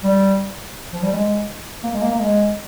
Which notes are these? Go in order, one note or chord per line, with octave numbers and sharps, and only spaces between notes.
G3
F3
G3
G#3
A#3
G#3
A#3
A#3
G#3